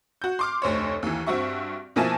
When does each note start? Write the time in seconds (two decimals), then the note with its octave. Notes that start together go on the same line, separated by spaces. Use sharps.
0.22 F#4 G6
0.39 C6 D6 F6
0.62 F1 D2 C5 C#5
1.03 D#2 E3
1.27 G2 C4 F#4 E5 C#6
1.96 B2 F3 A#3 E4 G#5 A5